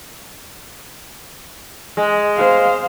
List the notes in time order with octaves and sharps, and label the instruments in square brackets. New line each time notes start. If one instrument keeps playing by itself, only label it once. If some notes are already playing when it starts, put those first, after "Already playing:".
[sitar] G#3
[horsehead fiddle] C5 F5